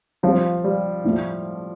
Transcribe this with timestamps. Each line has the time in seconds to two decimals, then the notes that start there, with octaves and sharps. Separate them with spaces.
0.23 F3 G3 C4 F4
0.64 G3
1.04 A2 F3 A3 F4